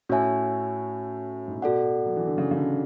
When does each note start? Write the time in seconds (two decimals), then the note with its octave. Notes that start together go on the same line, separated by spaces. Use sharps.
0.09 A2 C#4 F#4 C#5 E5 G#5
1.48 G#2
1.55 A2
1.62 B2 F#4 A4 D5 F#5
2.06 F#3
2.17 E3
2.27 D3
2.38 C#3
2.51 C#3
2.57 D3